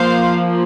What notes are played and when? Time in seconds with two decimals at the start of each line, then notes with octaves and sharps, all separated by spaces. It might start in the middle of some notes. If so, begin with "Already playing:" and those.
Already playing: F3 A#3 C5 F5